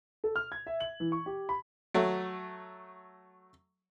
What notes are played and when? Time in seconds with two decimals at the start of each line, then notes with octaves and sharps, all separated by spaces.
0.24 A4
0.36 F6
0.52 G#6
0.67 E5
0.80 F#7
1.00 E3
1.12 C#6
1.26 G4
1.49 B5
1.94 F#3 A3